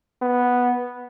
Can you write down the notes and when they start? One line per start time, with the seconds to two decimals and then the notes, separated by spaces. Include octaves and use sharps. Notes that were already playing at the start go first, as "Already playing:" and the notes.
0.22 B3